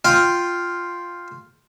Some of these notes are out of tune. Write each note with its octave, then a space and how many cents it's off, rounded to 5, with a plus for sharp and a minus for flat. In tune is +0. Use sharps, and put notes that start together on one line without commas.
F4 +0 G5 +0